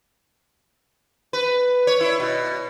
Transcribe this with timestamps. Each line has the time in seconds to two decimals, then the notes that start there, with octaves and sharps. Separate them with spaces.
1.33 B4
1.87 C#5
2.01 E4
2.20 B2